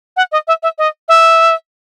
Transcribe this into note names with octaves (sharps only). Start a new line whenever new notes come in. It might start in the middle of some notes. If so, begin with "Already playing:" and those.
F#5
D#5
E5
E5
D#5
E5